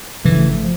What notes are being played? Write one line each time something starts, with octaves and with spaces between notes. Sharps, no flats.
G1 G2 C#3 E3 F3 A3
F3